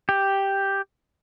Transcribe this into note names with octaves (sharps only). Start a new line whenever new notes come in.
G4